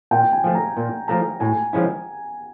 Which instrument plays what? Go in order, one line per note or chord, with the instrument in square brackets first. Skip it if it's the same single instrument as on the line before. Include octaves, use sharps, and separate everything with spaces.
[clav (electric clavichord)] A#2 [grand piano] G5
[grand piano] G#5
[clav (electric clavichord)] F3 A3
[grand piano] A#5
[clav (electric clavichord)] A#2
[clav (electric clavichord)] F3 A3 [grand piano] A#5
[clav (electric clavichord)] A2 [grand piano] G#5
[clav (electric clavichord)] F3 G#3 C#4 E4